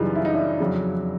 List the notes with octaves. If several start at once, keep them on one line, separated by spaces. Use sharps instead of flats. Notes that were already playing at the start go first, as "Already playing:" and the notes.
Already playing: F#2 C#3 E3 G3 D#4 F4
E4
D#4
D4 E4
F2 C#3 F#3